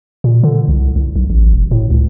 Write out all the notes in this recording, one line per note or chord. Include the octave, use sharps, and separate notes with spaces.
A#2
D3
C2
C2
B1
A1
E1
A2
C#2